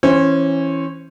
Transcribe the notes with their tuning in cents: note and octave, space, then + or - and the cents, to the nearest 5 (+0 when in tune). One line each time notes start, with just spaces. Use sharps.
E3 +0 C#4 -20 C5 +0